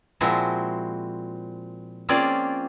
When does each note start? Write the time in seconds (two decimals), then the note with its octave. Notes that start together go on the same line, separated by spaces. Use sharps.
0.21 A#2 F3 G#3 C4 E4 F#4
2.09 A#3 C4 C#4 F4 G#4 D5